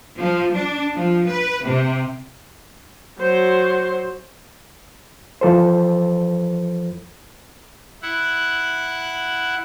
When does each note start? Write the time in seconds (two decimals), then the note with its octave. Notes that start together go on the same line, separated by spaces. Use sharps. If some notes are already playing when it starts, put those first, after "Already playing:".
0.18 F3
0.55 D4
0.95 F3
1.27 B4
1.65 C3
3.19 F#3 C5
5.41 E3 F3 A4 C5
8.02 E4 F#5